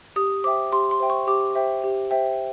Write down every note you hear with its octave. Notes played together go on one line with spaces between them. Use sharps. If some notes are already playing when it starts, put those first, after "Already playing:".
G4 D#6
C5 E5 G5 D6
G4 C6
C6
C5 E5 G5
C#6
G4 D6
C5 E5 G5
G4
C5 E5 G5